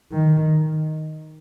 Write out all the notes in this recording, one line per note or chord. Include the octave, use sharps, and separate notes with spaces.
D#3